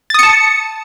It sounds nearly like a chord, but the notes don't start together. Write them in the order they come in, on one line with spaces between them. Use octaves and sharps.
A6 D#6 C#7 A5